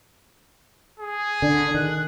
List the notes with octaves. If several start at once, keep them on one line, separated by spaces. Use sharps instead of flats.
G#4
D3 D4
D#3 F#6